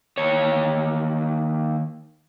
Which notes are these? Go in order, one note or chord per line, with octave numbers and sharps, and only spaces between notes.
D#2 C#5